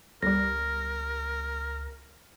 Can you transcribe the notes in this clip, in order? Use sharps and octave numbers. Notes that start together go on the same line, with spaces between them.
G1 C#2 G3 A#4 A#6